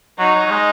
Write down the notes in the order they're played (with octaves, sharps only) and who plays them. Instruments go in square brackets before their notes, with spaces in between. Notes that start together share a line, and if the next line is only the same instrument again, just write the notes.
[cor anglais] F#3 [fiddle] D#4
[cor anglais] F#3
F#3
G#3